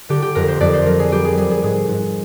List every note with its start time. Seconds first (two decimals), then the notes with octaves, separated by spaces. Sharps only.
0.09 D3 G4
0.22 G4
0.35 F2 A#4
0.48 C5
0.60 F2 D5
0.73 C5
0.86 F3 A#4
0.99 G#4
1.11 G3 G4
1.25 G#4
1.37 G3 G#4
1.51 G#4
1.63 G#2 G#4
1.89 G#2